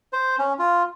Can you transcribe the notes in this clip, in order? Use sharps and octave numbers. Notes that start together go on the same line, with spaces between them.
C5
C#4
F4